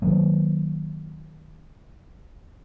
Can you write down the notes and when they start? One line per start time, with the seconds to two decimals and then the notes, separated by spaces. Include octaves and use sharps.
0.02 D#3 F#3 A#3